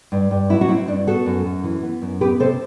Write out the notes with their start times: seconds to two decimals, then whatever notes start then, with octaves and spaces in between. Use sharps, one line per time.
0.12 G2
0.31 G2
0.50 F#3 E4
0.61 F#4
0.68 C4 E4
0.88 G2 D4
1.07 B3 F#4 A4
1.26 F#2
1.45 F#2
1.64 E3
1.83 B3
2.02 F#2
2.21 B3 G4 B4
2.40 C3 A4 C5